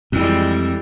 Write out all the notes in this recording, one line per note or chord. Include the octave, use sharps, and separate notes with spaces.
F2 E3 G3 G#3